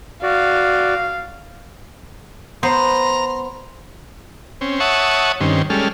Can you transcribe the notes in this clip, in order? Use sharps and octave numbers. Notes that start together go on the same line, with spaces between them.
F#4 D5 F5
B3 C5 A#5 C6
C4 C#4
C#5 E5 F#5 A5 C#6 D#6
G2 D#3 C4 C#4
G3 G#3 C#4 A4 F6